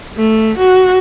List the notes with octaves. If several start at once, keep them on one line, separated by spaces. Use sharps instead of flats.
A3
F#4